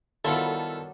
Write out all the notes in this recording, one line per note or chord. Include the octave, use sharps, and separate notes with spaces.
D#3 F#3 G3 B3 E4 F4 A4